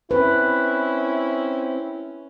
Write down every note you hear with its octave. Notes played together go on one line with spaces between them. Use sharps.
C4 C#4 E4 B4